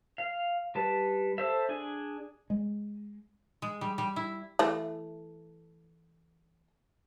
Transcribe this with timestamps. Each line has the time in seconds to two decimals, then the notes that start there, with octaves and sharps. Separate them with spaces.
0.18 F5
0.75 G3 B4 A5
1.38 A4 C5 E5
1.69 D4 G#4 G#5
2.50 G#3
3.62 G#3
3.81 G3
3.98 G3
4.16 E4
4.59 E3 A3